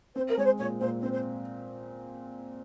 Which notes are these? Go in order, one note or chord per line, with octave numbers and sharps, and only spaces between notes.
C4 C5
A#4
G#3 C#5
C5
A#2 C#5
A#2 C5
C4 C5
C5